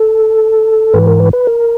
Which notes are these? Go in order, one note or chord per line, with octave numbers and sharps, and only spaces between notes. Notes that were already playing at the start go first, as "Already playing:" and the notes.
Already playing: A4
G#2 E3 B4
A#4
B4
B4
A#4